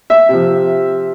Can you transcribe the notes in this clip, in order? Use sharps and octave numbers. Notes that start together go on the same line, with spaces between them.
E5
C3 F3